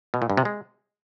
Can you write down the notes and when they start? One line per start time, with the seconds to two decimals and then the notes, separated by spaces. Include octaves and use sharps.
0.14 B2
0.22 A#2
0.30 G2
0.37 C3
0.45 G#3